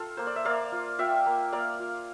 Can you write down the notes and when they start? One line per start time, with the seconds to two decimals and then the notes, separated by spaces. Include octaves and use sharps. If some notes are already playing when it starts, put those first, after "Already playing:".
Already playing: F4 A4
0.17 A#3 C5
0.27 D5
0.36 E5
0.45 A#3 D5 F5
0.72 F4
0.99 F4 E5 G5
1.26 A#3
1.52 A#3 D5 F5
1.80 F4